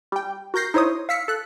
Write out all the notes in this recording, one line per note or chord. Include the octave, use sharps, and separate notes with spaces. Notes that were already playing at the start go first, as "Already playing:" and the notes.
G3 G5
F#4 A#4 G6 A#6 C7
D#4 E4 C5 C#5 D#6
F5 E6 B6 C#7
A4 F#6